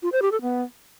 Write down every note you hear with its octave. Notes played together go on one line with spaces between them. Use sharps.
F4
C5
G4
A4
B3